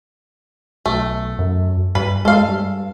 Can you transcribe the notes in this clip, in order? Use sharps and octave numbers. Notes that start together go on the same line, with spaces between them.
B1 A3
F#2
G2 B4
G#3 A4 F5
G2